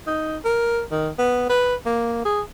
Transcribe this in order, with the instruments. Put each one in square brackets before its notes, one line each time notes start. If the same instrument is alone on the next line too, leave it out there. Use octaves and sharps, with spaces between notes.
[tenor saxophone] D#4
A#4
D#3
B3
B4
A#3
G#4